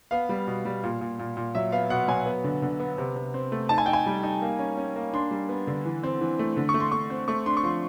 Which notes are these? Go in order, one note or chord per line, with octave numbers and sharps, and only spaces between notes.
B3 F5
G3
B2
G3
A#2
A#2
A#2
A#2
F#3 E5
B3 F5
B2 F#5
F#3 G#5
B3
D3
D3
B3
C3
C3
C4
A3
D#4 A5
G#5
D#4 G5
G#5
G3
D#4
A#3
C#4
C#4
A#3
D4 C6
G3
B3
D3
E3
C4
E3
A3
D3
C#6
A3
C6
A3 C#6
C4
A3 C#6
D4 C6
C#6
F3 C6